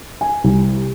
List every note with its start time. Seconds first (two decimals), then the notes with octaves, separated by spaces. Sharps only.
0.21 G#5
0.44 C2